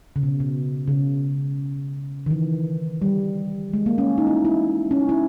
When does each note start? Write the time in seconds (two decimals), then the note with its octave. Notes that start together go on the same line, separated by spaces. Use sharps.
0.16 C#3
0.23 B2
0.40 B2
0.88 C#3
2.26 D#3
2.30 E3
3.02 G3
3.74 G#3
3.86 A#3
3.98 C#4
4.18 D#4
4.27 E4
4.45 E4
4.91 C#4
4.99 D#4
5.09 E4